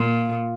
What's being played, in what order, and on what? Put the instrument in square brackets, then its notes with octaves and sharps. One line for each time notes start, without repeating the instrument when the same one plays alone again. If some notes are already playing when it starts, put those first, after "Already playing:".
Already playing: [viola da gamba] A#2 [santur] F4